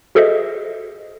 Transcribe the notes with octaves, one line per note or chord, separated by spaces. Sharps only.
F#4 G#4 A4 C5 D#5 E5